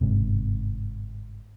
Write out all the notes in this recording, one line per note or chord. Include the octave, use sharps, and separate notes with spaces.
G1 G#2 C3